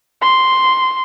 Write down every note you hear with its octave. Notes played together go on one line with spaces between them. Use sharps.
C6